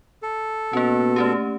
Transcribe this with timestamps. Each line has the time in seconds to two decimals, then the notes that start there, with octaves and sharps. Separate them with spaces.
0.23 A4
0.73 B2 A#3 C#4
1.16 A3 C#4 G4